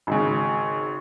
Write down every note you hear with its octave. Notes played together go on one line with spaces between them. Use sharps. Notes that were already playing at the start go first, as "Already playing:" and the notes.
G#1 C#3